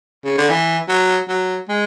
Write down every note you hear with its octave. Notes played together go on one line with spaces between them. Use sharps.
C#3
D3
E3
F#3
F#3
G#3